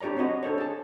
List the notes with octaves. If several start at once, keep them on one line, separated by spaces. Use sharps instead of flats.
D4 G4 C#5 D5 A#5
C4 F#4 C#5 D#5
D4 A4 C5 C#5
G#4 A5